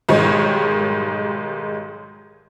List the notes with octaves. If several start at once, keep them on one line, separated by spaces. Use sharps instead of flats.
B1 G#2 D#3 G3 G#3 C#5